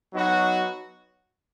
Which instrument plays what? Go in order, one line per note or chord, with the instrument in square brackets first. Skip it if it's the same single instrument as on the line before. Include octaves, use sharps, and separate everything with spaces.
[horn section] F#3 B3 D#4 F#4